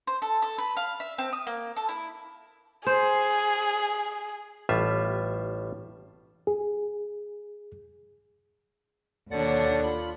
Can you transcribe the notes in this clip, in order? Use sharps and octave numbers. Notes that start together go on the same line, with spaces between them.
C5
A4
A4
B4
F5
E5
C4
D#6
A#3
A4
E4
G#4 C5
A1 A2 G3 F4 E5
G#4
D#2 B2 D3 D4 C#5 F#5 A6
F4 B5